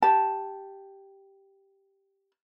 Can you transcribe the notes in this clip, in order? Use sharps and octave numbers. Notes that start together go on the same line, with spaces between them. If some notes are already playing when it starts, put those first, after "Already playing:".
G4 A5